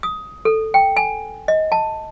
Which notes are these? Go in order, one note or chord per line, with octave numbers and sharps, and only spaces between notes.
D#6
A4
G5
G#5
D#5
A5